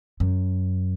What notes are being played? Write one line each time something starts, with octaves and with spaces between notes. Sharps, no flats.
F#2